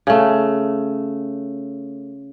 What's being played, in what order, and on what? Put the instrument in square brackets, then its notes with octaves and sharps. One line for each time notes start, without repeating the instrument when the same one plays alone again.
[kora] C#3 A3